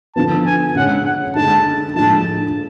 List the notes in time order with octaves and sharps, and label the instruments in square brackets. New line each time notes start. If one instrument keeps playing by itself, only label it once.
[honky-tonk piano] D3 F3 B3 [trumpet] A5
[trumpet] G#5
[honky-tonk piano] C#3 G#3 C#4 [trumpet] F#5
[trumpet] F#5
[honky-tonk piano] D3 G#3 D4 [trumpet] A5
[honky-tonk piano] A2 F3 G#3 D4 [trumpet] A5